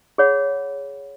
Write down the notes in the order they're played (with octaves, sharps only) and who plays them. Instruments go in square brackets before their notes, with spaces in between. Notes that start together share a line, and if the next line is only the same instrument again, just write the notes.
[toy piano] G#4 C#5 F#5 B5